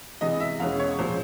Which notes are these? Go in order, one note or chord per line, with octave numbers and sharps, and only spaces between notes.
C3 E3 G#3 B3 D#5
E5
E2 B2 G#3 C#4 F5
C#5
A#2 F3 G#3 C#4 C5